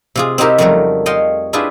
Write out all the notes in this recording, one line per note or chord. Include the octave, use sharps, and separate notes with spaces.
C3 F4 G#4
C4 D#4 E4 G4 A#4 E5
F2 C#3 F#3 G3 A3 A#4
C#5 D#5 F5 G5 C6
D4 E4 F4 G4 G#4 B4